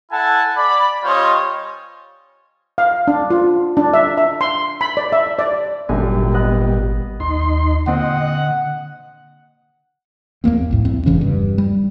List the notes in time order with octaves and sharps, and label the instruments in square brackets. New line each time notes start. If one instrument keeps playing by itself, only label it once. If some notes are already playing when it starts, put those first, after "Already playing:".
[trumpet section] E4 A4 F#5 G#5 A5
D5 B5
G3 C#4 F4 C5 C#5 D#5
[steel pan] F5
D4
F4
D4
E5
E5
C6
B5
D5
E5
D5
[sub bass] G#1 [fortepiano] F#2 D3 G#5 [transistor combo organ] A#2 G3
[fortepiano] B3 D#5 F#6
[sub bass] D#2 [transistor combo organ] D#4 C6
[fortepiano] A#2 C4 [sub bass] D3 [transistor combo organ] D#5 [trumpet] F#5
[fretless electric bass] E2 A3 A#3 C4
B1 A2
E2 C4
E1 C#3 E3 C#4
G2
G3